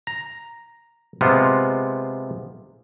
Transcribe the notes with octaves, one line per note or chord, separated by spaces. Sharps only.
A#5
C3 G#3 B3 F4